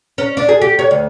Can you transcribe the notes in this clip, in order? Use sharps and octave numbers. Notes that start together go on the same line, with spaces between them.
C#4
D4
G#4
G4
C#5
D2